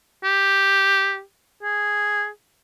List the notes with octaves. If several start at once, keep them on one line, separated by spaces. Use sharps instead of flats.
G4
G#4